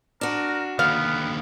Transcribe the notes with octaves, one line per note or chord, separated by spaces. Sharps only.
D4 F#4 A#4
D#2 D3 B3 F5